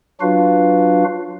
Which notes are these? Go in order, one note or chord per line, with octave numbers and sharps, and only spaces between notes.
F#3 D4 F4 F#4 B4 F5